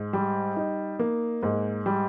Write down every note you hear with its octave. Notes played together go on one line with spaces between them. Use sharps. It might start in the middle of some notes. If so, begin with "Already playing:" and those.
Already playing: G#2
G3
D#4
A#3
G#2
G3